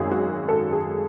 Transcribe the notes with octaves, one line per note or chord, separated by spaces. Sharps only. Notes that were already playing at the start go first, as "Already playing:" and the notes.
Already playing: G#1 F#2 D#3 F#3 G#4
F#4
A4
G#4